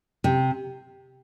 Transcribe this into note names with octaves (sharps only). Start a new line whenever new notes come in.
C3